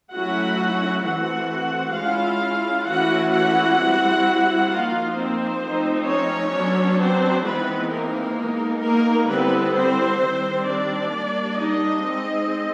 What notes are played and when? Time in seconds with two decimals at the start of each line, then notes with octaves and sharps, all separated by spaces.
0.13 F#3 A3 C#4 E4 F#4 F#5
1.05 E3 A3 C4 F#4 F#5
1.96 G#3 C#4 E4 F4 F5
2.87 E3 A3 C#4 E4 F#4 F#5
3.33 F#4 F#5
3.79 G3 C4 E4
4.70 F3 A#3 D#4 F4 F5
5.16 C4 C5
5.62 F3 A3 C4 D#4
6.08 C#4 C#5
6.53 F#3 B3 D4
6.99 C4 C5
7.44 E3 G#3 B3 C4 D#4 B4
7.91 A#3 A#4
8.37 G#3 B3 D#4
8.82 A#3 A#4
9.27 D3 G3 B3 C4 E4 B4
9.73 C4 C5
10.19 D#3 G3 C4
10.65 D4 D5
11.10 G3 A#3 D4
11.56 D#4 D#5
12.03 G#3 C4 D#4